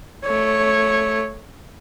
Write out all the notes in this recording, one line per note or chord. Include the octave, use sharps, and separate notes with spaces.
A3 C#5